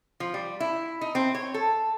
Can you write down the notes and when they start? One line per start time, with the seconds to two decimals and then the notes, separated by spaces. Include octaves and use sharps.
0.20 F3
0.34 G3
0.60 E4
1.01 D#4
1.15 C4
1.35 C#5
1.54 A4